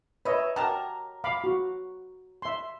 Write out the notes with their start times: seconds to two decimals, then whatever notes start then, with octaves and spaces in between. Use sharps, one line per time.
0.25 B4 C#5 D#5 E5
0.56 F#3 G4 A#4 A5 A#5
1.24 F5 B5 D6
1.44 F#4
2.42 E5 C6